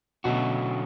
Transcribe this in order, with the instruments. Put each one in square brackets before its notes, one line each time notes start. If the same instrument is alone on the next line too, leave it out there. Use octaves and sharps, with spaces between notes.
[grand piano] B2 [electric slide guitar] D3 F#3 A3 C#4 F#4